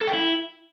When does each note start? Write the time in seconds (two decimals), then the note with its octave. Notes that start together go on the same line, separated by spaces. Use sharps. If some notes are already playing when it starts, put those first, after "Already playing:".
0.01 A4
0.07 G5
0.14 E4